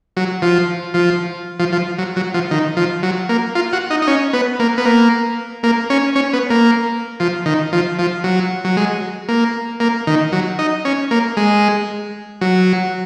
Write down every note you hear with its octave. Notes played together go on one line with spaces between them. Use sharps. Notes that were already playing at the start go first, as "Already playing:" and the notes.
F#3
F3
F3
F3
F3
F#3
F#3
F3
D#3
F3
F#3
A#3
F4
F#4
D#4
D#4
C#4
B3
A#3
B3
A#3
A#3
C#4
C#4
B3
A#3
F3
D#3
F3
F3
F#3
F#3
G#3
A#3
A#3
D#3
F#3
D#4
C#4
A#3
G#3
F#3